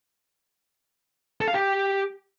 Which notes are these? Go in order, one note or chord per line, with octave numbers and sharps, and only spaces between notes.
A4
F5
G4